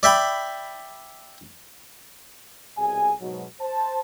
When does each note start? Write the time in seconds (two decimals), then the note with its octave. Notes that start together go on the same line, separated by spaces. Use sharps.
0.03 D5 E5 G5 B5
2.78 C2 B2 G#4 G#5
3.20 G#2 B2 F#3
3.61 C5 A5